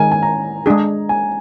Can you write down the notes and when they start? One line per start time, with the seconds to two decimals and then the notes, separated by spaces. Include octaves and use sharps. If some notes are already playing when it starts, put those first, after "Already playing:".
Already playing: D#3 G#3 D#4 A#4 G#5
0.12 G#5
0.23 A#5
0.66 G#3 D4 G#4
1.09 G#5